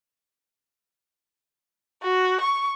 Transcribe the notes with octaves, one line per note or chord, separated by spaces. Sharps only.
F#4
C#6